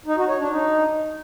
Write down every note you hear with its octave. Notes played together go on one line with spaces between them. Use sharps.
D#4
F#4
C#5
D4
D#4